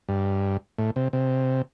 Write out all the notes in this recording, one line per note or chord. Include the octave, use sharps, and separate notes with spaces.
G2
A2
C3
C3